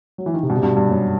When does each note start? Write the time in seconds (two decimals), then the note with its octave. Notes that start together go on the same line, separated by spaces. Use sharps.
0.18 F#3
0.26 E3
0.34 D#3
0.43 C3
0.49 G2 B2
0.56 C3
0.63 G2 B2
0.77 G2
0.90 F#2